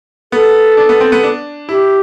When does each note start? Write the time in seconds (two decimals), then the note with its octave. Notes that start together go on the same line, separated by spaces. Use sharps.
0.32 B3 A4
0.77 D4
0.89 B3
1.01 C4
1.12 B3
1.23 D4
1.69 E4 G4